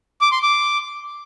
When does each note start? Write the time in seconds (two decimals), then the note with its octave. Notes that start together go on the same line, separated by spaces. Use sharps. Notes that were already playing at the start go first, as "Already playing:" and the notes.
0.21 D6
0.32 C6
0.42 D6